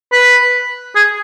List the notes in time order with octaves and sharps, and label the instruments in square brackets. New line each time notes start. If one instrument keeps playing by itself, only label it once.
[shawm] B4
G#4